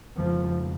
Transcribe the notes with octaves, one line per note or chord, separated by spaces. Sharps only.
F2 C#3 F3 G#3 C#4